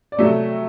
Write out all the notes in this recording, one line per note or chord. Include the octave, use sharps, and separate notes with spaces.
D5
C3 F#3 A3 E5